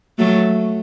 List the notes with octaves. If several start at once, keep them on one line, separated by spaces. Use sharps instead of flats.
F#3 A3